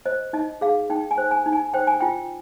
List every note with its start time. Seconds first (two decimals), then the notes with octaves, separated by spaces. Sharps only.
0.06 C5 D#5
0.33 D#4 D#5
0.61 G#4 F5
0.90 D#4 G5
1.11 G#5
1.18 C5
1.31 G#5
1.46 D#4
1.53 G#5
1.74 C5 G5
1.87 G#5
2.00 F4 G5